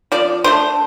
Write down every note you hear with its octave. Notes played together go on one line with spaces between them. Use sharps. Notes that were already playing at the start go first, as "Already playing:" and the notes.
F3 D5
A3 D4 C5